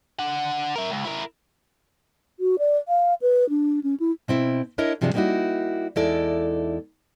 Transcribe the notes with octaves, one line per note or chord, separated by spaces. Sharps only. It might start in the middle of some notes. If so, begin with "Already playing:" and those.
D4 F#5
A#4 E5
C#2
E4 A#4
F#4
D5
F5
B4
D4
C#4
E4
B2 C4 E4
D4 E4 A#4 C#5 D#5
G2 C3 F3 F#3 G#3 D4
G3 A#3 B3 D#4 E4 F#4
E2 G#3 D#4 E4 A4 D5